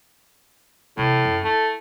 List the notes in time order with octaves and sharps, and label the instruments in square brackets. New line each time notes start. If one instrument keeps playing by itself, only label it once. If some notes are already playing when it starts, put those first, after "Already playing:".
[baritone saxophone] A2 [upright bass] C3 E3
[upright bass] F#2
[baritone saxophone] A3 [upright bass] E4